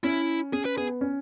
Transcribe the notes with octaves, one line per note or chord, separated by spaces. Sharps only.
C#4 E4
C#4 G#4
B4
B3 G#4
C#4